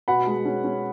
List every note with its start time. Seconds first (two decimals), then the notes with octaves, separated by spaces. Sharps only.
0.08 B2 F#5 B5
0.27 G#3
0.45 C#4
0.64 C#4